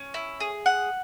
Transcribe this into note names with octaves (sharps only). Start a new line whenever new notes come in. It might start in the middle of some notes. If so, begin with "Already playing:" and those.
Already playing: C#4
E4
G#4
F#5